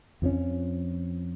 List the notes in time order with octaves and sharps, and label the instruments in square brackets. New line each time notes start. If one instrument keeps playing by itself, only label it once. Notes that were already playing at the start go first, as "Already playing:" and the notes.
[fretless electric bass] F2 F3 A#3 C#4